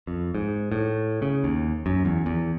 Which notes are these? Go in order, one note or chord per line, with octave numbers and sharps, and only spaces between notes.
F2
G#2
A2
C#3
D#2
F#2
E2
E2